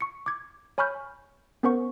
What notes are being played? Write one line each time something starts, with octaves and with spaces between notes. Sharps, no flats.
C#6 C#7
D6 G#6
C#5 G#5 B5 C#6 F6 G6
B3 C#4 A#4 C5 F#5 C#6